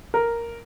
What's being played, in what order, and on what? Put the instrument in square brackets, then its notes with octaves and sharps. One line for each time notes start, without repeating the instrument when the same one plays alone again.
[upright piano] A#4